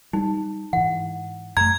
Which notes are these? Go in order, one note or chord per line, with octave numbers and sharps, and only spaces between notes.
G3 D#4
G#2 E3 F#5
F#2 A3 A#5 G#6